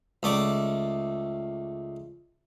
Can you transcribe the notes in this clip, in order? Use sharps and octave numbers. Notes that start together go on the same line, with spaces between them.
C#2 A3 D5